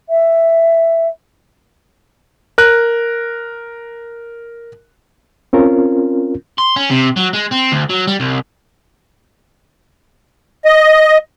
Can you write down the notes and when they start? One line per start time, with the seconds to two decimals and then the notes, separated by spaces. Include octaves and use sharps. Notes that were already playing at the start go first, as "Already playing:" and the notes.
0.09 E5
2.58 A#4 F#6
5.53 C4 C#4 F4 A#4
6.58 C6
6.76 C#4
6.90 C3
7.17 F#3
7.34 G#3
7.52 C4
7.72 D2
7.90 F#3
8.07 G3
8.20 C2
10.65 D#5